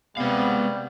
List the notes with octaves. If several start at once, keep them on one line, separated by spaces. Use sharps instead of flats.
C3 G3 G#3 B3 F5